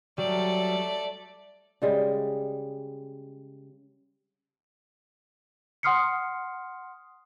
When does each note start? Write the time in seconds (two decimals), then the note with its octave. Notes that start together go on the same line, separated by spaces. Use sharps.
0.18 F#3 G3 A3 D5
1.82 C#3 G3 G#3
5.83 F#5 C6 D#6 F6 C7 C#7